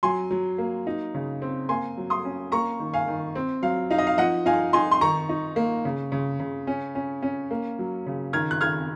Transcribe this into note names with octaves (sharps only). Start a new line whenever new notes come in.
F#3 G#5 C6
F#3
A#3
D#4
C#3
C4
A#3 G#5 C6
F#3
C6 D#6
C#4
A#3 A#5 C#6
D#3
F5 G#5
D#3
C4
F#3 F5
D#4 F5
D#5
F5
F3 D#5 F#5
D#4 F5 G#5
D#4 G#5 C6
C6
D#3 A#5 C#6
D#4
A#3
C#3
C#3
C#3
C#4
C#4
C#4
A#3
F#3
C#3
D#3 F6 G#6
F#6
D#3 F6 G#6